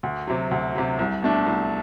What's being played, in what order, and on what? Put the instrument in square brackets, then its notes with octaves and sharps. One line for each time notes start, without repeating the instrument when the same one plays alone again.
[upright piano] D2
C3 F#3
D2
C3 F#3
C2
B2 A3 D4
C2